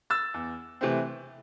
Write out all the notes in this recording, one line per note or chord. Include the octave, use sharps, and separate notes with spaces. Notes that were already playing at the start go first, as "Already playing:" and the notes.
E6 A6
E2
C3 E3 A3 C4